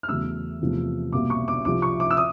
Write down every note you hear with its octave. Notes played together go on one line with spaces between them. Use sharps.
F6
E2 C#3 F#3 A3 E6
E2 C3 F3 A3
C2 B2 G3 A#3 D6
C#6
D6
C2 C3 F3 D6
C#6
D6
E6
D#6